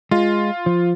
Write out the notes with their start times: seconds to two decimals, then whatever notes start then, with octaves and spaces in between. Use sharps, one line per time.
0.11 G#3 F4
0.66 F3